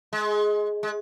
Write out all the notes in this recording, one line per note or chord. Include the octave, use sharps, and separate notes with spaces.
G#3
G#3